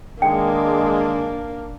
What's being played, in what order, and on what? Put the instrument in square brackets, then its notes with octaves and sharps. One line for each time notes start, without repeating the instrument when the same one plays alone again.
[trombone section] D#3 G#3 [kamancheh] A#3 [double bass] D4 [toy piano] G5